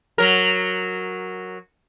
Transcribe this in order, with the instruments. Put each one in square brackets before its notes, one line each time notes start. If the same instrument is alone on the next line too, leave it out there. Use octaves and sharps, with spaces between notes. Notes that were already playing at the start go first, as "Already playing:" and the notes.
[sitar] F#3 A#4